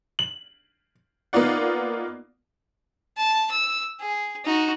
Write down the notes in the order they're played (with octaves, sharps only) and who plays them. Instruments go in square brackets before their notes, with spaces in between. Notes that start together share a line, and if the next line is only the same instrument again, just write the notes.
[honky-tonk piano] F#7
A#3 B3 D#4 F4 D5 F#5
[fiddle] A5
E6
G#4
D#4 F#4